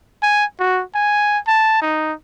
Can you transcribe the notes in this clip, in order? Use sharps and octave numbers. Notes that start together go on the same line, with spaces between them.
G#5
F#4
G#5
A5
D#4